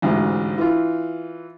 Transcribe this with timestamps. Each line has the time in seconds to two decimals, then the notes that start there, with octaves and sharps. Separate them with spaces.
0.02 A1 D2 G#2
0.58 E3 F4